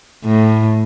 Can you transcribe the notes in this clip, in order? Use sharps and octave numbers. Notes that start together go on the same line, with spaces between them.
A2